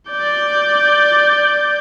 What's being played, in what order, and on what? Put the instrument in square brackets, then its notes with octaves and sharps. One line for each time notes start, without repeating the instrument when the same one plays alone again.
[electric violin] D5 G6